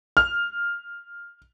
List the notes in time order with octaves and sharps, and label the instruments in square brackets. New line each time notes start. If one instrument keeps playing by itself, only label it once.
[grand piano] F6